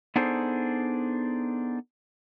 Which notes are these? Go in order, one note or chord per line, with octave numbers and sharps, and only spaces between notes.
B3 D4 D#4 G#4 A4 C5